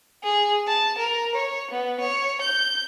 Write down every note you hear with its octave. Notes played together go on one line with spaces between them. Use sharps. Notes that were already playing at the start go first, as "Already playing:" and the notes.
G#4
A5
A#4
C#5
B3
C#5
G6